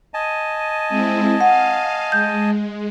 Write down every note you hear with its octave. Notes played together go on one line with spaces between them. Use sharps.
D#5 G#5 A5
G#3 C4 E4
F5 F#5
G#3 G6